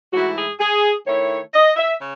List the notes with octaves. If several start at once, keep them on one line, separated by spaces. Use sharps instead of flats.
G#2 E3 A3 E4 F#4
G#4
G#4
D#3 A3 E4 C#5
D#5
E5
C#3